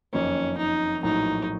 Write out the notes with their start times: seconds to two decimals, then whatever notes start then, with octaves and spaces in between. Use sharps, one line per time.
0.13 F#1 F2 D#3 A#3 C#4
0.58 D#4
1.03 A#1 A2 F#3 A#3 D#4